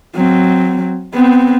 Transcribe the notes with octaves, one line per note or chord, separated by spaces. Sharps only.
F#3 C4
B3 C4